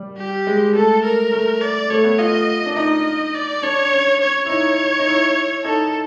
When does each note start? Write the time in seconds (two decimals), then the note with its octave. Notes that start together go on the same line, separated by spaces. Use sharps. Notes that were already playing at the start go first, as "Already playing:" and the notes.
Already playing: G3
0.17 G4
0.47 G#3
0.75 A3 A4
1.04 A#4
1.33 A3
1.62 D5
1.90 A3 C#5
2.04 B3
2.18 F4 D#5
2.66 D4
2.76 D#4 D#5
3.35 D5
3.63 D4 C#5
3.92 C#4
4.21 C#5
4.45 E4
4.49 D#4 C#5
4.99 D#4
5.07 E4
5.64 D#4 A4